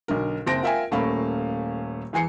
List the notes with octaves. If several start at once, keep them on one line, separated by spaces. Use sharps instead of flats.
B1 D3 A#4
F#1 C4 A5 A#6 D7
F4 A#4 E5 G5 G#5
D#1 A3 A#3 C#4 F5 B5
E2 E3 G#5 C7 C#7